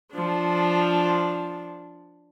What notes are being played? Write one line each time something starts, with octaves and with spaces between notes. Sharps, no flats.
F3 D4